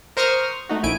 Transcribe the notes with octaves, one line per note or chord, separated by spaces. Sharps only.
A#4 C5 C#6 D#6 F6
A3 D#4 F#4
A#1 E4 G#5 D7